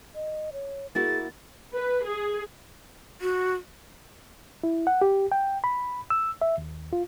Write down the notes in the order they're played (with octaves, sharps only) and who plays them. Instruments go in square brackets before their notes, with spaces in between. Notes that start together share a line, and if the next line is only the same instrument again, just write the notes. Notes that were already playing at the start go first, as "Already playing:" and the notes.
[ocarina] D#5
C#5
[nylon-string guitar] A#3 E4 F#4 [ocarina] G#4 [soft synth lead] A6
[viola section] B4
G#4
[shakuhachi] F#4
[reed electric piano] E4
F#5
G4
G5
B5
E6
E5
D#2
F4